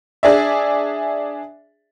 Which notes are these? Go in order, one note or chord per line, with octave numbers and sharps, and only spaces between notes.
D4 G#4 D5 E5